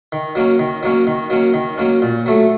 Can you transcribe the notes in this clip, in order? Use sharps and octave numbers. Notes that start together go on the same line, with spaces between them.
D#3
F#3 A#3 C#4
D#3
F#3 A#3 C#4
D#3
F#3 A#3 C#4
D#3
F#3 A#3 C#4
A#2
F#3 A3